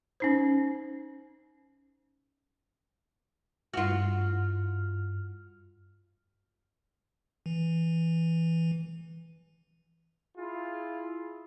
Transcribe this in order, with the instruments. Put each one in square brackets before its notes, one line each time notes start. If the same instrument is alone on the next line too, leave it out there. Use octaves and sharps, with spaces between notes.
[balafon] C#4 D#4 C5
[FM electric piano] G2 F6 [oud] F4 F#4
[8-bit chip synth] E3
[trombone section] E4 F4 G#4